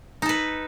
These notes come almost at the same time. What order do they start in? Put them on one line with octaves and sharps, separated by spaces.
D#4 A4 B4